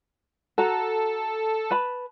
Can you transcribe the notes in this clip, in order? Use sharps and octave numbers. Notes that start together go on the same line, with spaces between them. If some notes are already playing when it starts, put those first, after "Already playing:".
F#4 A4 A#5
B4 A5 B5